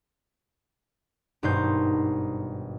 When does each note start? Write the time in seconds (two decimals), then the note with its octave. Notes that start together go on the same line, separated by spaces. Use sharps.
1.43 G#1 G2 B2 D#4 C5 G6